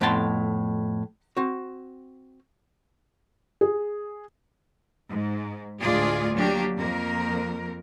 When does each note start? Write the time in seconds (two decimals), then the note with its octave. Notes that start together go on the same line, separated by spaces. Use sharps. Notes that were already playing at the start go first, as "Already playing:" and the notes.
0.01 F2 A2 B3 G5 A5 C6
1.37 C4 F#4
3.61 G#4
5.10 G#2
5.81 D2 A2 G#3 F4 G#4 D5
6.34 F#3 A#3 D4 G4
6.76 F2 A#3 A#4